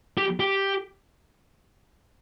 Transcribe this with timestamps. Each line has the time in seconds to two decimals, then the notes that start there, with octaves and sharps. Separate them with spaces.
0.18 G4
0.40 G4